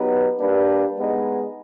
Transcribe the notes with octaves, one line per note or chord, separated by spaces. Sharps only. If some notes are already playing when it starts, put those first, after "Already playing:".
Already playing: F#3 B3 D#4 G4 B4
G3 A#3 D4 G4 B4
G#3 B3 D#4